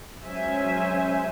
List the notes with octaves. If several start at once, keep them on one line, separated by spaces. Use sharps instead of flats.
F#3 G#3 C#4 C5 E5 G#5